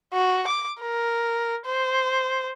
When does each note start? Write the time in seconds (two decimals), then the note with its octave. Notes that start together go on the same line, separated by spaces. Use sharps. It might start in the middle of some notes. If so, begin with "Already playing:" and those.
0.13 F#4
0.47 D6
0.80 A#4
1.65 C5